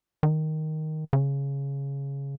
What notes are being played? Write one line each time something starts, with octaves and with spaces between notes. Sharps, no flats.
D#3
C#3